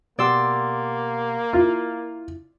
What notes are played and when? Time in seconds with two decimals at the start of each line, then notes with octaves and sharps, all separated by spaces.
0.19 B2 A#3 G4 D5 F#5 C6 E6
1.53 E4 F4